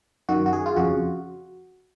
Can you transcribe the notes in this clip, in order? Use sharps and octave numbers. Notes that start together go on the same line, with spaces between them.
F#2 D#3 F#4
F#4
G#4
F4
F2 C#3 F#4